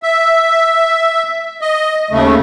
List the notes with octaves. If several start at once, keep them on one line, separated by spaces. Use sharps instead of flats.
E5
D#5
D#2 C#3 A3